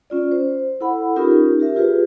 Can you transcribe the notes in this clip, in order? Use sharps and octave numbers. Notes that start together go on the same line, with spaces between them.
C#4 F4 D5
C5
E4 A4 F#5 B5
C#4 D#4 F4 G4 A#4
G4 A#4 E5
F4 G4 G#4 B4